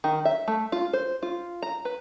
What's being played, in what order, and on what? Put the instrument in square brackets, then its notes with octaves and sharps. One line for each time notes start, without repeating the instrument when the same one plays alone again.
[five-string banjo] D#3
E5
A3
F4
C5
F4
A#5
B4